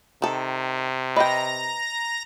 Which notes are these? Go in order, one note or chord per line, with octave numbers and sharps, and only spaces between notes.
C3 D#3 A4
B4 D#5 G5 A#5 A#6